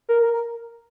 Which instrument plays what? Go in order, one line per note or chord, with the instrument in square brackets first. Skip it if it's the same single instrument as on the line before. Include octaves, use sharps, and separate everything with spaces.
[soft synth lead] A#4
A#4
A#4